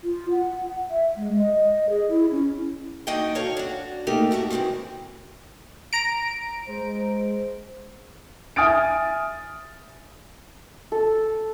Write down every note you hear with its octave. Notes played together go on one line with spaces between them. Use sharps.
F4
F#5
E5
G#3
D#5
G#4
E4
C#4
A#3 D4 D#4 F#4 D#5 G5
A4 C#5 F5
D4 F#4
A3 A#3 D#4 G4 A#4
G#2 F#4 A4 E5
C3 D#3 E3 G#3 C4
A#5 D7
G#3 C5
E5 G#5 D#6 F6 A6 D7
A4